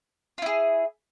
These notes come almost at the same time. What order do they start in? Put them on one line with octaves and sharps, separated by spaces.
F4 E4 G#4